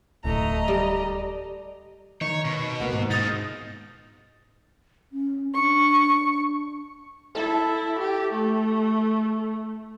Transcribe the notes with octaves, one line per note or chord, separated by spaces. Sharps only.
D1 A3 D#5 A#5
G3 D5
D#3 C#5
B2
A#3 B3 F#4
G#2
D#4 F4 D#6 A6
C#4
D4 C#6
E4 A4
G4
A3